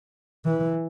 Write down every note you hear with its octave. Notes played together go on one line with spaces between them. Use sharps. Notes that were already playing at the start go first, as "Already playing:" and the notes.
E3